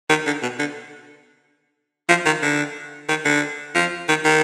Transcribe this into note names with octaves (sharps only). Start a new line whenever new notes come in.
D#3
D3
B2
D3
F3
D#3
D3
D#3
D3
F3
D#3
D#3